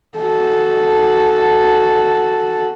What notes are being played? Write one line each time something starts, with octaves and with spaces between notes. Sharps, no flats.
F#4 A4